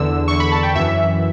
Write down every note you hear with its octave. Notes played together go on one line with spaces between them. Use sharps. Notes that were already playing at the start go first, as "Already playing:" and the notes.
Already playing: E2 D3 E6
E2 D3 C#6
B5
A5
G5
F#2 E3 E5